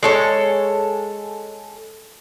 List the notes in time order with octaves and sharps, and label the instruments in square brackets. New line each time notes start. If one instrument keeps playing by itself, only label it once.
[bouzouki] G#3 A4 C#5